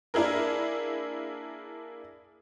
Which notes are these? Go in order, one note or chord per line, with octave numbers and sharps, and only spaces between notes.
A#3 D4 E4 G#4 A#4